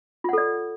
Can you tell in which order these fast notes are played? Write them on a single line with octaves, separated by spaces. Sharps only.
F4 F#5 A4 D5